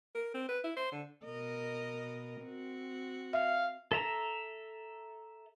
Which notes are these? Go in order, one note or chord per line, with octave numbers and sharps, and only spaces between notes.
A#4
C4
B4
E4
C5
D3
B2 A#4 D#5
C4 F#4
E5 F5
A4 E5 A#5